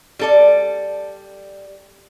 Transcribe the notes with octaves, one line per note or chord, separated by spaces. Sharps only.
G3 A4 D5